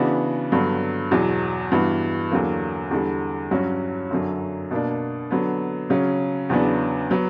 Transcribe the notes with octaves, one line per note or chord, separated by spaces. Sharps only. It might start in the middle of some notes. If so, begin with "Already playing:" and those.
Already playing: C#3 E3 B3 D4 F#4
G2 D3 F#3 B3
E2 B2 F#3
G2 E3 B3 F#4
E2 D3 F#3 A#3
E2 D3 G3
G2 F#3 C#4 F#4
F#2 D3 F#3
B2 A#3 D4
D3 F#3 B3
C#3 F#3 C#4
E2 C#3 F#3 B3 D4
F#3 B3